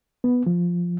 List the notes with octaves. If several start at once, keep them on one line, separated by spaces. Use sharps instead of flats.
B3
F3